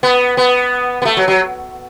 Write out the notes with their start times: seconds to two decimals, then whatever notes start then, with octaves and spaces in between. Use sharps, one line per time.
0.03 B3
0.37 B3
1.02 B3
1.05 A3
1.17 F#3
1.28 F#3